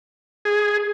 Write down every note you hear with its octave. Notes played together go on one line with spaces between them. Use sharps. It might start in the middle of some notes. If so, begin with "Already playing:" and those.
G#4